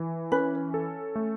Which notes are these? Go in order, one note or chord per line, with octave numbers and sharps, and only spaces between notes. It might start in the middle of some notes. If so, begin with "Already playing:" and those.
Already playing: E3
C#4 B4
A4
A3